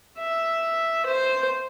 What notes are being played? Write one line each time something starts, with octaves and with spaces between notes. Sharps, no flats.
E5
C5